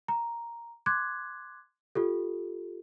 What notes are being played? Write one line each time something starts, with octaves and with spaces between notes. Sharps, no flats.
A#5
C6 D6 F#6 G#6
F4 G4 A4